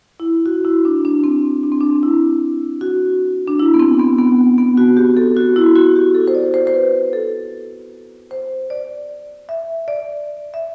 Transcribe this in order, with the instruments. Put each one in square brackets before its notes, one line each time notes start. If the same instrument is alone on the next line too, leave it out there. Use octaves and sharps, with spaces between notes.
[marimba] E4
F#4
E4
D4
D4
C4
D4
C4
D4
E4
F#4
D4
E4
B3
C4
B3
B3
B3
F#4
G4
A4
F#4
E4
F#4
G4
A4
C5
D5
C5
C5
B4
A4
C5
D5
E5
D5
E5